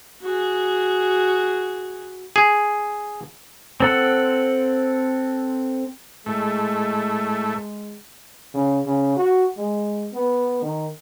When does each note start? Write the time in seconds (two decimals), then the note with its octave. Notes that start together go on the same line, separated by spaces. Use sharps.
0.22 F#4 G#4
2.36 G#4
3.80 C4 A4 F#5
6.26 A2 G#3 A3
8.54 C#3
8.86 C#3
9.17 F#4
9.57 G#3
10.13 B3
10.62 D#3